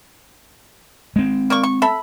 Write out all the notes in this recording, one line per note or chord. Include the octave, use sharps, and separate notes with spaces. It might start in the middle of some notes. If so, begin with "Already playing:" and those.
G#3 C4
A#3 D5 C#6
C#6
A4 E5 B5